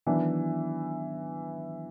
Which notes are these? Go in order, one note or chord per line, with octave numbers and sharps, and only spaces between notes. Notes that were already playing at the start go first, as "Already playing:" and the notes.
D#3 E3 F#3 B3 D4